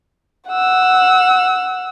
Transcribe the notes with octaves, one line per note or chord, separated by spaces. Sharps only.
F#5 E6